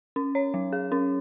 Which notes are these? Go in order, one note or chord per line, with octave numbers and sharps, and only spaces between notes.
C#4
C#5
F#3
G#4
C#4